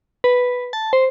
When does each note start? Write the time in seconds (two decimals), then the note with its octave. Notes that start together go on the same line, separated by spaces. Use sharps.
0.24 B4
0.73 A5
0.93 C5